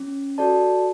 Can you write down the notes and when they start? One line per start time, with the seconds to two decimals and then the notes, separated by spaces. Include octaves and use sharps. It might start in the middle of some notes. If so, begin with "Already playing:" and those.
Already playing: C#4
0.38 F#4 A4 D5 A5